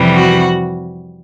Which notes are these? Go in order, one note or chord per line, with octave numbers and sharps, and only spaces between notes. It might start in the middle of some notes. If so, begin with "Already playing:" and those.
Already playing: F2 C3 E3 G3
F#4